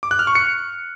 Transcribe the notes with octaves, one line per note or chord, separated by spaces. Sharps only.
D6
F#6
F6
C#6
C#7